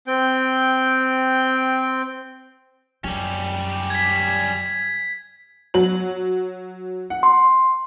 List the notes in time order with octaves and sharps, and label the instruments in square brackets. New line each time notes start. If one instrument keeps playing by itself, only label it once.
[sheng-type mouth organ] C4 G5
[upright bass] F#2 [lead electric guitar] G3 C#4 [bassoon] G4
[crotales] G#6 B6
[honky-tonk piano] F#3 F#7
F#5
[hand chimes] C6